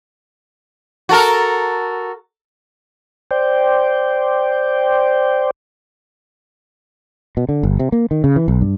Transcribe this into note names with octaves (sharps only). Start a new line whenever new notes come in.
F#4 A4 A#4
C5 D5 G5
B2
D3
G1
C3
A#3
D#3
C#3
E3
B1
G2